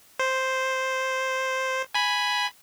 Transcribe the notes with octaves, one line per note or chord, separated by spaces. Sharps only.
C5
G#5 B5